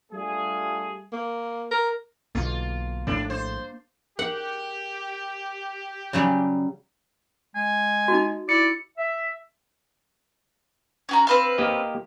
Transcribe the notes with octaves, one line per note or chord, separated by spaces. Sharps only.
G3 A3 D4 F4 G#4
A#3
A#4
B1 D3 A#3 F4
A#1 A2 G3 D4
C5
G4 G#4 A#4 F#5
C#3 F#3 G3
G#3 G#5
D#4 F#4
E4 D5 C#7
E5
C#4 F#4 A#5
C4 B4 F5
A#3 G4 D#5